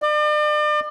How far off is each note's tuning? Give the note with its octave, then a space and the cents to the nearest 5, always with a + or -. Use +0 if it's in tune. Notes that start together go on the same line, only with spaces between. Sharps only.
D5 +40